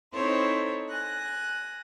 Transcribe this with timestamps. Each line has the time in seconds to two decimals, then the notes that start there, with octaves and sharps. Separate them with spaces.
0.12 C4 D#4 E4 A4 C5 C#5
0.89 G#5 F#6 A#6